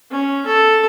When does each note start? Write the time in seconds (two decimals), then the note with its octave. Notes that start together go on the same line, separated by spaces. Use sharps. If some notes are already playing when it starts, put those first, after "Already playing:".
0.11 C#4
0.46 A4